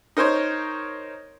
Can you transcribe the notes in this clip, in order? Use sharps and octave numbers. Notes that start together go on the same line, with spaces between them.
D#4 A#4 C5 C#5